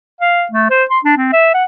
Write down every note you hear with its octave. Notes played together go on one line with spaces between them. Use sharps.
F5
A3
C5
C6
D4
C4
E5
F#5